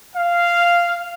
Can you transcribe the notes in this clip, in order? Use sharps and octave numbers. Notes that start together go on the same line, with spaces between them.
F5